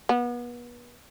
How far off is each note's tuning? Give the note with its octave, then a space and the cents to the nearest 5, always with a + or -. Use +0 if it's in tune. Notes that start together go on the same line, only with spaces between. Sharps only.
B3 -35